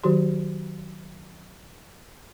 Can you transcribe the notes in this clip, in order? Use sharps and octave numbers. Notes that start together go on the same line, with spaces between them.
D#3 F#3 F#4 G4 C6